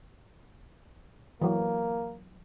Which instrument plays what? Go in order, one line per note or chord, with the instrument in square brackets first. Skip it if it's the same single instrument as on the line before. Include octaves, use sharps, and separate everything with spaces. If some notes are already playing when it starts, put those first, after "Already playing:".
[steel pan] E3 F#3 [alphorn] A#3